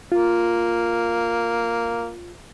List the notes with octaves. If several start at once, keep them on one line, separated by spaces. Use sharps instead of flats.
A#3 F4